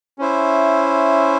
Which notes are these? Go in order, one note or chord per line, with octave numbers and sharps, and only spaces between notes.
C#4 E4 C5 E5